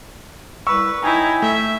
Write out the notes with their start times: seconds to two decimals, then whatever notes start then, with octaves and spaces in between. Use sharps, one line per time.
0.67 C2 B4 C#6 E6
1.02 D#4 E4 C#5 G5 G#5
1.42 A3 E5